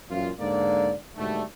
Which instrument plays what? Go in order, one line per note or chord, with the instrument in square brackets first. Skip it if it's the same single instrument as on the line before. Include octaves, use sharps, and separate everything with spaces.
[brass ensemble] F#2 A#2 E3 F4
G#2 D3 A#3 D5
G#2 B2 D3 G3 A3